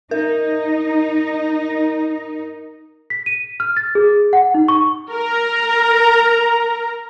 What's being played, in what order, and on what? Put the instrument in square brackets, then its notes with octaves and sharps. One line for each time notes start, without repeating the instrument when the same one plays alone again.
[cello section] D#4 [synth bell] A#4
[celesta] B6
D#7
F6
A6
G#4
F#5
D#4
C#6
[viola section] A#4 A#5